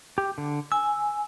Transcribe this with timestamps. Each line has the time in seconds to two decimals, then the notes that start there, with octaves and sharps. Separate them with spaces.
0.18 G4
0.38 D3
0.72 G#5 E6